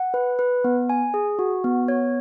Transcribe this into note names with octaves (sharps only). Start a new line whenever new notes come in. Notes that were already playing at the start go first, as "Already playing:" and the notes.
Already playing: F#5
B4
B4
B3
G#5
G#4
F#4
B3
C#5